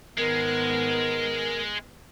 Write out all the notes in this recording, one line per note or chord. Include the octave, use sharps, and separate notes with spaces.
G#2 D#3 G#3 B3 A#4